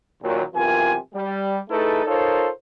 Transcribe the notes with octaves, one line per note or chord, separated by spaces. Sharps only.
D#2 A#2 F#3
B1 C3 E3 F4 A#4 G#5
G3
A3 D#4 E4 G#4 A4 B4
D#4 F4 A4 A#4 C5 C#5